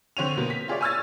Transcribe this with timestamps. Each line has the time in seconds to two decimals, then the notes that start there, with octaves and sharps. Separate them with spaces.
0.17 D3 C4 C#5 D#7 F7
0.37 B2 A#3 B3
0.50 B6
0.68 F4 G#4 C#5 D5 E5
0.81 G#5 C#6 E6 F6 G#6 A6